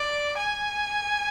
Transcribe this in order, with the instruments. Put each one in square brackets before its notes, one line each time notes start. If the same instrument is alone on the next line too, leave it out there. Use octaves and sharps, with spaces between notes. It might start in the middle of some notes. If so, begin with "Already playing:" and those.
Already playing: [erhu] D5
G#5